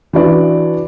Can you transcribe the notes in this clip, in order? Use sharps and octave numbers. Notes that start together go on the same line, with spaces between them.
E3 D4 F#4 B4 D5